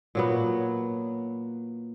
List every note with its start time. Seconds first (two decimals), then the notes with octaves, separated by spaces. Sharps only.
0.15 A#2 F#3 B3